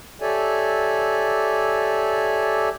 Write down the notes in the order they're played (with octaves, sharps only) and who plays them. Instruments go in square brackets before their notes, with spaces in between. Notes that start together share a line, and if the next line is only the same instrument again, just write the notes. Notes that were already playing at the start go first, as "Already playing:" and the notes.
[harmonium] G4 A4 C#5 D5 E5 G#5